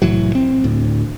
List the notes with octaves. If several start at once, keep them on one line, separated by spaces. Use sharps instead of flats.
C2 A2 E3 F#3
C4
D2 A2